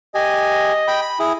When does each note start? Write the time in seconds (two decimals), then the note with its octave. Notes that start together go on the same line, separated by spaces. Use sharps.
0.15 G4 D#5 G#5
0.88 G5 B5
1.02 B5
1.19 E4 G#4